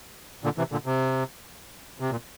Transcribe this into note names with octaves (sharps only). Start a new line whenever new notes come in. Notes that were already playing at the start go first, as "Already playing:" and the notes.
A#2 D3
C3 E3
A#2 D3
C3
C3
A#2